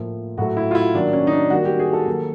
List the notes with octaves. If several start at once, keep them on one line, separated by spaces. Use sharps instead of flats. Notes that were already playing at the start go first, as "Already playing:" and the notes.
Already playing: A2 F3 A#3
A2 F#3 A3 F#4
E4
F4
E4
D#3 F#3 A#3 D4
C#4
D#4
D4
D#3 G3 A#3 F#4
G4
G#4
A4
D#3 F#3 A#3